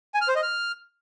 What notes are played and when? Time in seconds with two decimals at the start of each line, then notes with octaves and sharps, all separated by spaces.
0.14 G#5
0.21 F6
0.28 C5
0.35 D#5
0.43 F6